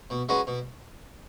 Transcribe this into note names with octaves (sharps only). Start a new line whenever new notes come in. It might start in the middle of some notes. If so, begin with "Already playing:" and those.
B2
G#3 C#4 F#4 B4
B2